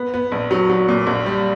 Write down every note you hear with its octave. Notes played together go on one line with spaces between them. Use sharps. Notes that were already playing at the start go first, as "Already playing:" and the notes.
Already playing: B3
B3
A#1
F#3
F#3
A#2
A#1
G3